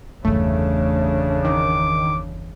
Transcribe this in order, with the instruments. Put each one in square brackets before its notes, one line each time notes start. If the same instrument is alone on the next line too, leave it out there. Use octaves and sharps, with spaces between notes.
[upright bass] G1 E2 [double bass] C#3 D4 [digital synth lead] A3
[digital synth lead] D#3 [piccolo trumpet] D6